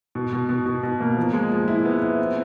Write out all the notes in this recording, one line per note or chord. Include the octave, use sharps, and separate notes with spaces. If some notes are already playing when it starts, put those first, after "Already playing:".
B2
B2
B2
B2
B2
A#3
F3
G#3
F3
E4
B3
E4
C4